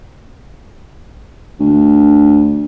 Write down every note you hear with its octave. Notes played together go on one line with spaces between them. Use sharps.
D2